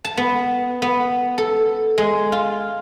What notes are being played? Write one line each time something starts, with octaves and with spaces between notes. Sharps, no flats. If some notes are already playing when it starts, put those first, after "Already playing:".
A5
B3
B3
A4
G#3
F4